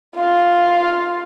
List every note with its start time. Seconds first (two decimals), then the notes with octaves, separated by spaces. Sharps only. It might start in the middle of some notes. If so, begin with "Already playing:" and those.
0.15 F4 F5